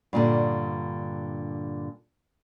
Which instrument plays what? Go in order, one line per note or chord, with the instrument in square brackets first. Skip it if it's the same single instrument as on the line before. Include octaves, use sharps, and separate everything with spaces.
[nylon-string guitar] G2 A#2 D3